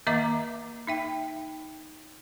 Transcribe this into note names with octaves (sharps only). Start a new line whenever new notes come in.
D#3 A#3 D#5 E5 A#5 D6
D#4 E5 G5